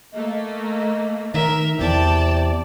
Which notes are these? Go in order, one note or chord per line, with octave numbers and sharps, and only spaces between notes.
A3 A#3 D#5
D#3 A#4 E5
E2 C3 E3 D5 G5 A5